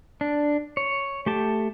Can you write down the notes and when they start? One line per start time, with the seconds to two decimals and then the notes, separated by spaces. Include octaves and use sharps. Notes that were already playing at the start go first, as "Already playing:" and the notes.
0.21 D4
0.77 C#5
1.26 A3 G4 A5